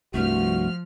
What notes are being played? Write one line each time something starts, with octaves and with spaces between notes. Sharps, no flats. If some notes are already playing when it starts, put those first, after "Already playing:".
C2 G2 F3 A3 F#4 F6